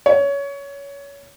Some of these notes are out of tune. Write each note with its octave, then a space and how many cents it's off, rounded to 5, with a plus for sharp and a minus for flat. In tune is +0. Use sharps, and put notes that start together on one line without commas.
C#5 +20